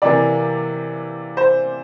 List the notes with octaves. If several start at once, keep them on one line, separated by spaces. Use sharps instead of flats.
C3 E3 A#3 D5
C5